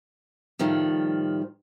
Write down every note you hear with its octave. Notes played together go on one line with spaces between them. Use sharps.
A2 D#3 F3 G3